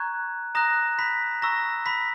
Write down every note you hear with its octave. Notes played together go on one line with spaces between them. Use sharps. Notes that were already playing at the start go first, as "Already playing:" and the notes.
Already playing: A#5 C#6 F#6 G#6
A#5 D#6 F#6 A#6
B5 B6
A#5 C#6 E6 A#6
B5 B6